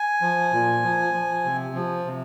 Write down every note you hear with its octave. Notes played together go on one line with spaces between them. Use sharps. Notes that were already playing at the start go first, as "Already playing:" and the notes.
Already playing: G#5
F3
A#2
F3
F3
C3
F3
C3